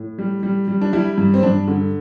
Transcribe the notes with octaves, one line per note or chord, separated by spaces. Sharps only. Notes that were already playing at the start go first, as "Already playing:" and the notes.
Already playing: A2
G3
G3
G3
D4
G3 E4
G2
C4
G2 D4
D3